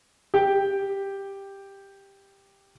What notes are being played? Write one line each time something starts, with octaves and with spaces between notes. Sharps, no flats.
G4 G5